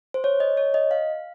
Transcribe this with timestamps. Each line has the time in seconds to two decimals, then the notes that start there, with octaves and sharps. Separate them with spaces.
0.14 C5
0.24 C#5
0.40 D#5
0.57 C#5
0.74 D#5
0.91 F5